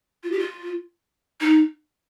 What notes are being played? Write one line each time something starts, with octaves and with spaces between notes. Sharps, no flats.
F4
G4
F4
D#4